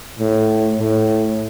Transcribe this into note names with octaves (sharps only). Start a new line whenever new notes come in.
A2
A2